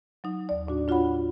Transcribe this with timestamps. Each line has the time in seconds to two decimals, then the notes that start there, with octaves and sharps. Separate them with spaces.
0.24 F#3 D#4
0.49 D#2 D5
0.67 A2 D4 F#4
0.88 D4 F4 F#4 C#5 F#5 B5